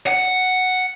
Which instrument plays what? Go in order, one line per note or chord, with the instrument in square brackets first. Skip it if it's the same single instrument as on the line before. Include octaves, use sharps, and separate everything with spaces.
[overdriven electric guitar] F#5